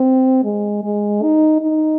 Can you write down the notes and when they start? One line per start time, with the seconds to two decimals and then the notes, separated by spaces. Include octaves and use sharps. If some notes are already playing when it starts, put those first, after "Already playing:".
Already playing: C4
0.44 G#3
0.84 G#3
1.23 D#4
1.61 D#4